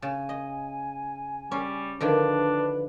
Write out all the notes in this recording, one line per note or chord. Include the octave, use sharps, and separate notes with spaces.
C#3 G#5
D#5
G3 C#4
D3 D#3 F3 D4 B4